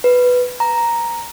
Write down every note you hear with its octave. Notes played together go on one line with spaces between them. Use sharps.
B4
A#5